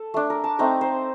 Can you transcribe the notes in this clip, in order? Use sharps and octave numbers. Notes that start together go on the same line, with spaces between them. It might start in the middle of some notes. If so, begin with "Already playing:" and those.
Already playing: A4
A3 D4
A#4
A5
A3 C4 D#4 A#5
C5